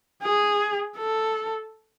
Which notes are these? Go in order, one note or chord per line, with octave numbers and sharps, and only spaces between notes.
G#4
A4